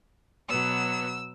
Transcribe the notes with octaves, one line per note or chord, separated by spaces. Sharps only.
B2 F#3 B3 E6